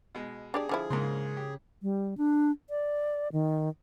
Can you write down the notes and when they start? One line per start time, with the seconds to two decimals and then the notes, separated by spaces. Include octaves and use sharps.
0.15 B2 G#3
0.54 D4 G4 G#4 D5
0.69 D3 F3 E4
0.90 G#2 C#3 A#3 C6
1.37 G4
1.82 G3
2.18 D4
2.70 D5
3.32 D#3